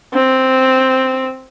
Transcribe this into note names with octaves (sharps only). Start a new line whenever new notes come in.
C4